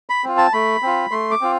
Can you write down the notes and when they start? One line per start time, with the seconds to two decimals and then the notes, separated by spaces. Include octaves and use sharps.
0.09 B5
0.24 C4 F4
0.38 A5
0.53 A3 B5
0.82 C4 F4
1.11 A3 C6
1.31 D6
1.41 C4 F4